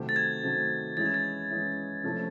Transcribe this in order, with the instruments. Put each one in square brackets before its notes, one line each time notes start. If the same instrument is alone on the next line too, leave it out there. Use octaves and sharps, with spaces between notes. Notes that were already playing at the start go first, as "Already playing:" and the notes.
Already playing: [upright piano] C3 D#3 F#3 A3 C4
[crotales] A6
G#6
[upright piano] C3 D#3 F#3 A3 C4
[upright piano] E3 G#3 C#4 E4 [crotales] A6
[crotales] G#6
A6
[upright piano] E3 G#3 C#4 E4
C3 F3 A3 C#4 E4